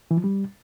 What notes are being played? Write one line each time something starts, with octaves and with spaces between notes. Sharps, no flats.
E3
F3
G3